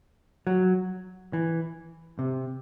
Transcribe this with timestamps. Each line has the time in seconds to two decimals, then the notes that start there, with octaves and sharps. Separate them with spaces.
0.47 F#3
1.33 E3
2.19 C3